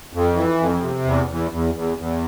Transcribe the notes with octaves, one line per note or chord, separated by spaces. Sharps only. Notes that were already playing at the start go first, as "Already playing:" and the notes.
F2
E3
F2
C3
E2
E2
E2
E2
E2